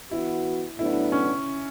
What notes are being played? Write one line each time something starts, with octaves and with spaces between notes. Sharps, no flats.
E3 B3 E4 F#4
A2 F#3 B3 D4 E4
C#4